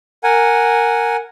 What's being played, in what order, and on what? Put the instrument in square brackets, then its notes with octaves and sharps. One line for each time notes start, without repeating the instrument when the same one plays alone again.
[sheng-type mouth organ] A#4 F#5 G#5